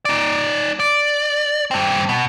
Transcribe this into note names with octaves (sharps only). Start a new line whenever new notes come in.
D#4 D5
D5
G2 C4
B2